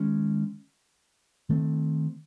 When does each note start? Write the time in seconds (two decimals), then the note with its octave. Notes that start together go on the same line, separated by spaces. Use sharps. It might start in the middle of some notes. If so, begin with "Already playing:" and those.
Already playing: D#3 G#3 C#4
1.49 D#3 A3 C4